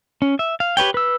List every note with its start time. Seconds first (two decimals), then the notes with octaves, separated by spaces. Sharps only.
0.22 C#4
0.39 E5
0.60 F5
0.77 G4 B4 C#5 G5
0.94 B4 E6